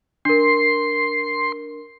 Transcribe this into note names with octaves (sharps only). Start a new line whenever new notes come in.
D4 A#4 C6